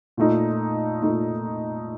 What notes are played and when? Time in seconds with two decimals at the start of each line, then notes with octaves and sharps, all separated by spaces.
0.17 A#2 A3 D#4
1.02 A#2 A3 D#4